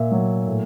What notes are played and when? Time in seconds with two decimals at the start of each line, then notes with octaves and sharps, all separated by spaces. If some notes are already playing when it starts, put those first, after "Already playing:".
Already playing: A#2 E5
0.11 F#3
0.47 A2